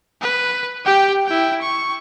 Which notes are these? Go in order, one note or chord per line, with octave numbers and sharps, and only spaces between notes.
B4
G4 G5
E4 G5
C#6